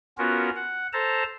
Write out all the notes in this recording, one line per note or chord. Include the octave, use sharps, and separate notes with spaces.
B3 C#4 F4 F#4 A#4
F#5
A4 C5 A5 A#5